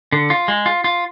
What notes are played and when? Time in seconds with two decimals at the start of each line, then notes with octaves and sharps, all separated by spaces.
0.12 D3
0.30 F4
0.48 G#3
0.66 F4
0.84 F4